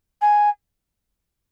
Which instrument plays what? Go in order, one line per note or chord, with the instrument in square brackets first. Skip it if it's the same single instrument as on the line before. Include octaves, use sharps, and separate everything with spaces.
[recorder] G#5